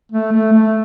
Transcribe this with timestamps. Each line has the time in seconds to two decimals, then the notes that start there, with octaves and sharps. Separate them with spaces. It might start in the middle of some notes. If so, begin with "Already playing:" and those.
0.12 A3
0.33 A3
0.53 A3